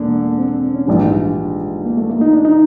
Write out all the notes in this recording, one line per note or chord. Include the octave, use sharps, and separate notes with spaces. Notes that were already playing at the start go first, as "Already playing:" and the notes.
Already playing: E1 D3 A#3
C4
C4
C#4
A#1 G#2 E3 G3 D4
D#4
D4
A#3
A3
A#3
D#4
D4
D#4